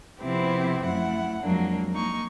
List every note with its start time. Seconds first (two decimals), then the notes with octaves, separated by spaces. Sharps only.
0.20 C3 F3 B3 C4 E4 G4
0.84 F#2 A3 E4 F#5
1.43 F2 F#3 G#3 A#3 D4
1.93 A#3 D#4 C#6